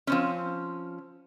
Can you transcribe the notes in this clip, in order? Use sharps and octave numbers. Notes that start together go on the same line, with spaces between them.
F3 C4 C#4